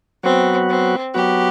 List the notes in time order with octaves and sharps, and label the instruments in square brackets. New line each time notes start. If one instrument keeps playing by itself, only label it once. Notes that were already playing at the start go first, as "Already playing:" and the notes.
[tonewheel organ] F#3 B3 F#4 [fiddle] C4
[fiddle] C4
[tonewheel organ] F#3 B3 F#4 [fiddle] G4